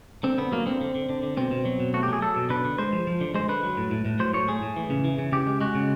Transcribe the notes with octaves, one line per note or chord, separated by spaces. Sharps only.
D3 C4
D3 B3
F#3 A#3
D3 C4
D3
D3
D3
D3
B2 C4
B2
F#3
B2
A3 F#4
G4
F#3 G#4
F#3 A4
B2
D3 B4
D3
G#3 C5
F3
F3
D3
G#3 C5
D3 B4
F#3
A2
A2
A2
F#3 C5
A2 C#5
A3 G#4
A2
E3
C#3
E3
C#3
C#3 G4
G#3
G#3 F#4
C#3